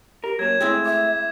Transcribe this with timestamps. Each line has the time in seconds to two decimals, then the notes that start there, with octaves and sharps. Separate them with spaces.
0.24 G4 A#4
0.39 F#3 A#3 C#5 G#6 E7
0.61 A2 G#3 C4 E4
0.86 E5 D6 G#6